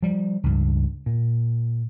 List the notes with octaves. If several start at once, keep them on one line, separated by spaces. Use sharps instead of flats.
F3 G3
C#2 G2
A#2